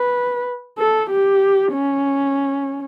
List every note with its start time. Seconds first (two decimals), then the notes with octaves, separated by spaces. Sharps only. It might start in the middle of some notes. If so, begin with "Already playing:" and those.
Already playing: B4
0.79 A4
1.10 G4
1.72 C#4